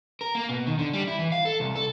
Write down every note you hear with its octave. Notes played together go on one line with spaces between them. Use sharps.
A#4
A#3
B2
D#3
D3
G3
E4
E3
F5
A4
C2
A4